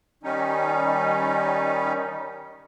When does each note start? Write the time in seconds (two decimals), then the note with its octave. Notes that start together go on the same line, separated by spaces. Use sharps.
0.23 D#3 G3 C#4 D#4